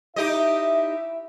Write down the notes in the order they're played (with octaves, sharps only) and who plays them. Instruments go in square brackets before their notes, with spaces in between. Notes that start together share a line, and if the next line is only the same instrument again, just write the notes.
[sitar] D#4 G4 D#5 [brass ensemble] E4 E5